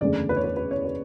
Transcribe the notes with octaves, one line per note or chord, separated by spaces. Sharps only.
F#1 E2 D3 A3 D5
B4
C#5
B4
B4
C#5
B4